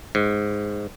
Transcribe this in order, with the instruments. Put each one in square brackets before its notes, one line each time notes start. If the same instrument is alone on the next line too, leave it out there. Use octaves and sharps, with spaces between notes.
[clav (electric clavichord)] G#2